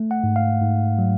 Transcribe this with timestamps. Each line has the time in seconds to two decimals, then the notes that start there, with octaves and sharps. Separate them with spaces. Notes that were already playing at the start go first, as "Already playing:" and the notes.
Already playing: A3
0.11 F#5
0.24 G#2
0.36 F5
0.62 G#2
0.99 F#3